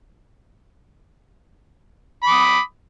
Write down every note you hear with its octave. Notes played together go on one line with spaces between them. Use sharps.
B5 D6 D#6